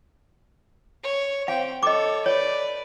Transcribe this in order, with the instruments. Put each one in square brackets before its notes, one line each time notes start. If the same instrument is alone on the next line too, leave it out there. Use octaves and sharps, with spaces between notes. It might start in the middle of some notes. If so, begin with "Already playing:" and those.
[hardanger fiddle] C#5
[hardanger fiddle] C4 G5 [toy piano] F5
[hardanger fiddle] A4 C#5 [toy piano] D#5 D6
[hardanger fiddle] B4 D5 [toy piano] C#5